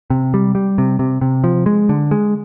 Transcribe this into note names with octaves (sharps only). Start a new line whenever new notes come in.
C3
G3
G3
C3
C3
C3
F3
G#3
D3
G#3